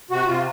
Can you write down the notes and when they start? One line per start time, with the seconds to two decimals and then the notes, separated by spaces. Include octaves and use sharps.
0.11 C3 F#4
0.27 C3 F4